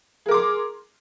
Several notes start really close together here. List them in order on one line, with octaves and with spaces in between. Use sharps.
G#4 A#4 D6 C6